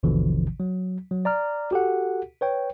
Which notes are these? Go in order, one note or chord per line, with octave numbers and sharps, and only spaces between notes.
G#1 D#2 B2 D3 E3 F3
F#3
F#3
D5 A#5 F6
F#4 G4 A4 F#5
B4 C#5 G5